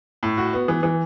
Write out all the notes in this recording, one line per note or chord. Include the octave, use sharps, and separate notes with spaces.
A2
F#4
B3
E3
E3